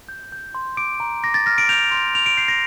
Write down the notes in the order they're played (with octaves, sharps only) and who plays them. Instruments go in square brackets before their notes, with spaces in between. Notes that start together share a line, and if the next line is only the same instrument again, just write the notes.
[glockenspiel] G6
G6
C6
D6 D7
A#5
D6 A#6
A6
F6 A#6
D7
G6 F7
C6
G6 F7
D7
G6 C7
A#6